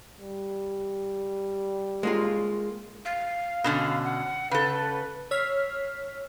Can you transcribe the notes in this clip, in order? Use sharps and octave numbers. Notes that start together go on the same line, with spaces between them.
G3
G#3 A#3 F4
F5
B2 D3 C#4
F#5
C#3 A4 B4
C#5 E6 F6 B6 C7